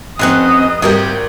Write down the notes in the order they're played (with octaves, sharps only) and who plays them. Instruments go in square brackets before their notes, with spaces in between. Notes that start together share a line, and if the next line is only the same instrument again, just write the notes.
[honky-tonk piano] F1 F#6 [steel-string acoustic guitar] C4 C#4 F#5 [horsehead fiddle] D#5
[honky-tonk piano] G#1 A#4 G6 [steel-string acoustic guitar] C3 G3 G4